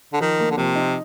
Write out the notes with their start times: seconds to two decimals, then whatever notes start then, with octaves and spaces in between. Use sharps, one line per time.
0.13 D3
0.20 D#3 F3
0.39 A#3
0.51 D3
0.57 C3 F3
0.75 D#4